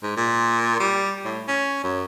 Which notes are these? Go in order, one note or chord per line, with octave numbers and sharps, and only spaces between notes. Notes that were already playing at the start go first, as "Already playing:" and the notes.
G#2
A#2
G3
A2
C#4
F#2